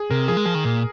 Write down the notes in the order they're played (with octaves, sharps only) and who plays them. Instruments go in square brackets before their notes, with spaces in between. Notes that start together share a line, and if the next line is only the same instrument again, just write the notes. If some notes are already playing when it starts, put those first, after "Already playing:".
Already playing: [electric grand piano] G#4
[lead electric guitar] C3 [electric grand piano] A#4
[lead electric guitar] F3 [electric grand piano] G#4
[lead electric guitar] G#3
[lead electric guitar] F3 [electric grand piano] G#4
[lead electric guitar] D#3
A#2